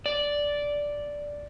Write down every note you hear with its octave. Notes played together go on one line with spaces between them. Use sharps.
D5